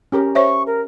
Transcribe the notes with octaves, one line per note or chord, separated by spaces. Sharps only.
C#4 G4 A#4
C5 C#5 E5 C#6
A#4